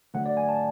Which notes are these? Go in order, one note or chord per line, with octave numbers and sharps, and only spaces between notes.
D3 F#3 A3 F#5
D5
G#5
A5